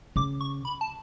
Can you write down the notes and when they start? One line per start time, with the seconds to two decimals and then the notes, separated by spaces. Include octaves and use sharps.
0.16 C#3 D6
0.41 C#6
0.65 B5
0.81 A5